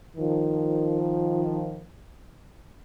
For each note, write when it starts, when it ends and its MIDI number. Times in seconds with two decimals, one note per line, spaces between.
0.16 1.85 51
0.16 1.85 53